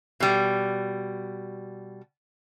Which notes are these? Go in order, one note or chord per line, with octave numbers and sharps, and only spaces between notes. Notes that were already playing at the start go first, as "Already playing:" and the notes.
B2 G3